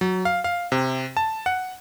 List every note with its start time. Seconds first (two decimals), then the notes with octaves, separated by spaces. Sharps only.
0.01 F#3
0.25 F5
0.44 F5
0.72 C3
1.17 A5
1.46 F#5